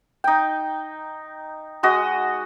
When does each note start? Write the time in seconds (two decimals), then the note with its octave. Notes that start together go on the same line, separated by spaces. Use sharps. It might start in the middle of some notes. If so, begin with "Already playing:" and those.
0.24 D#4 G5
1.83 G#3 F#4 D#5